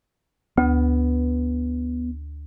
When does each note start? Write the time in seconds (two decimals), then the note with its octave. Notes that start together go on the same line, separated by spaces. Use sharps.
0.58 D2 B3